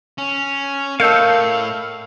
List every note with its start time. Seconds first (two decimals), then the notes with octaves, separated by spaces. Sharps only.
0.18 C#4
1.00 A2 A#4 D#5 F5 A5 E6 G6 C#7